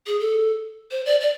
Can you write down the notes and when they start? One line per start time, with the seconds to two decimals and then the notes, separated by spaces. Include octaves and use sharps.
0.07 G#4
0.20 A4
0.91 C5
1.06 D5
1.21 D5